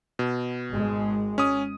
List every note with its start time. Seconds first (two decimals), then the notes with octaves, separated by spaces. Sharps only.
0.19 B2
0.71 G#1 G#3
1.38 C#4 D#6